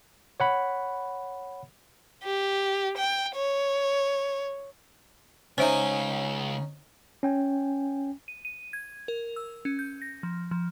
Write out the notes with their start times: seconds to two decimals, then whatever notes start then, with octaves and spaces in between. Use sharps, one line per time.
0.40 C#5 F#5 B5
2.24 G4
2.97 G5
3.35 C#5
5.58 C#2 C#4 D#4 C5 E5 G#5 A#5
7.23 C#4 G5 G#5
8.28 D#7
8.45 D#7
8.73 G#6
9.08 A#4
9.36 E6
9.65 C#4
9.79 G6
10.02 A#6
10.23 F3
10.51 F3